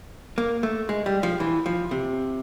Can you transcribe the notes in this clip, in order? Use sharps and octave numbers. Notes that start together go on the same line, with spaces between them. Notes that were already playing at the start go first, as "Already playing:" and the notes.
A#3
A3
G#3
G3
F3
E3
F3
C3